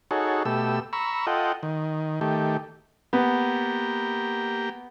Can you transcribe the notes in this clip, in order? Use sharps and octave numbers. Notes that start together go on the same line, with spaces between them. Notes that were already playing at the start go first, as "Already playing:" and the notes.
D#4 F#4 G#4 A4 C#5
B2 A3 G4 E6
A#5 B5 C#6 E6
F4 A4 D#5 F#5 G5
D#3
D#3 A3 G4
A#3 B3 G4